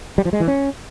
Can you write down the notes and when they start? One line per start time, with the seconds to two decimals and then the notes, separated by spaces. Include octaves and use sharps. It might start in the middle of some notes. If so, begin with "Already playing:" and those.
0.18 G3
0.25 F3
0.33 G#3
0.40 E3
0.48 C#4